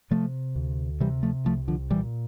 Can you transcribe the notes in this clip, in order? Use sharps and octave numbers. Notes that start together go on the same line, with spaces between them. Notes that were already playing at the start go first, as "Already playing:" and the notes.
C3 F3 A3
D2
C3 E3 G3
F3 A3
C2 F3 A3
D3 F3
A#2 E3 G3